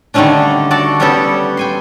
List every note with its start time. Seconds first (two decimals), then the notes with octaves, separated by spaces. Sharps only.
0.14 D3 D#3 G3 A3 C#4 D4
0.71 F#4 A4 D5
1.00 G3 B3 C#4 G4 A4
1.57 G5 G#5 C6